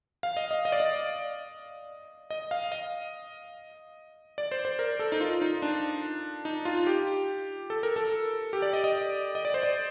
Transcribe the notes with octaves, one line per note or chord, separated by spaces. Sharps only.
F5
D#5
D#5
D#5
D5
D#5
D#5
F5
D#5
D5
C5
C5
A#4
A4
D#4
F4
D#4
D4
D#4
F4
G4
A4
A#4
A4
G4
D5
D#5
D#5
D#5
D5
C5
D5